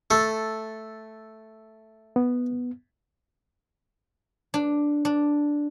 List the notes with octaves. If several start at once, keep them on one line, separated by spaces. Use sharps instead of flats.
A3 A4
B3
D4
D4